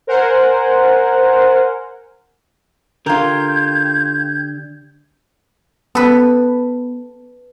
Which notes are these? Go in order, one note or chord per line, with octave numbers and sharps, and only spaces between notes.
A#4 C5 F#5 G#5
D3 F4 G4 A#4 G6 G#6
B3 A4 B4